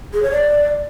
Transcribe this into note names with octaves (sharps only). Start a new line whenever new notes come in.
G#4
C#5
D5